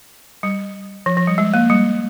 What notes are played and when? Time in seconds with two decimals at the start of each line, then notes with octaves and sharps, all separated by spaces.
0.43 G3
1.06 F3
1.17 F3
1.27 G3
1.38 G#3
1.54 A#3
1.70 G3